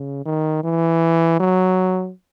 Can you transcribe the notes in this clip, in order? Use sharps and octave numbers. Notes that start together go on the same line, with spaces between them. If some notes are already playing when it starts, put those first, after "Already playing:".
Already playing: C#3
D#3
E3
F#3